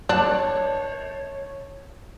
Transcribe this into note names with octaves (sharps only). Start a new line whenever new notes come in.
D4 C#5 A5